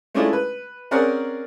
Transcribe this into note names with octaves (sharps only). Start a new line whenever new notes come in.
G#3 A3 C#4 D4 E4 F4
B4
C4 C#4 G#4 A#4 D5 F#5